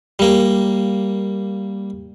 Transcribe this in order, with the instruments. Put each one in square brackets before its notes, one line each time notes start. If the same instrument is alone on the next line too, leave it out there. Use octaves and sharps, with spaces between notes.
[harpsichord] G3 A#3